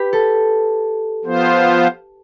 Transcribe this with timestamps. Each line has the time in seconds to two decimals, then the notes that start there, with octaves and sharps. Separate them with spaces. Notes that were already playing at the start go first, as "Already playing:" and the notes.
Already playing: G4 B4
0.13 A4
1.25 F3 B3 F4 C5